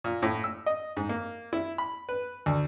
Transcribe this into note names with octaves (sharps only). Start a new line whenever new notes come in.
A#2
A2
E6
D#5
G#2
A#3
E4
B5
B4
D2